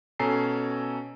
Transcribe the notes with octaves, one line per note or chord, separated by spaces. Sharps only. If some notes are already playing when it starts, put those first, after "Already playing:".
B2 C#4 A4 G#5 A#5 C7